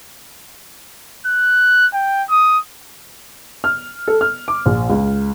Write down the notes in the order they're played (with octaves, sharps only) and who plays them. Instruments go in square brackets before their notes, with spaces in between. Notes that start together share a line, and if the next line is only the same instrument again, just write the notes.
[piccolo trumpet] F#6
G5
D#6
[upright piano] F6
A4
F6
D6
A#1
C#2